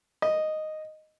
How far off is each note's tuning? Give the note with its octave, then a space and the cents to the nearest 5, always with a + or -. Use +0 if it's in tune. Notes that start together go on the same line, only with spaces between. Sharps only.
D#5 -5